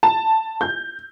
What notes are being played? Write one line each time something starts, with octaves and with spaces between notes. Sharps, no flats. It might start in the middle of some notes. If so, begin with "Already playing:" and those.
A5
G6